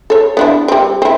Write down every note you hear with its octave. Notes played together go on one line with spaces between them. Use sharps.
A4 C#5
B3 D4 E4
G3 C4
C4 E4